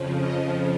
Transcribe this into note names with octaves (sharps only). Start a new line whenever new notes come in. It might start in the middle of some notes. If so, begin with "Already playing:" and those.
Already playing: F2 C#3 F3
D#5